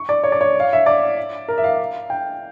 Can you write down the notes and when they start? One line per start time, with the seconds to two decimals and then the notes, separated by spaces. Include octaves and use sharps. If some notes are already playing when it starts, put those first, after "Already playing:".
Already playing: C#6
0.09 D5
0.24 C#5
0.32 D5
0.41 C#5
0.60 F5
0.73 E5
0.86 D5
1.48 A#4
1.58 E5
1.64 F5
2.10 G5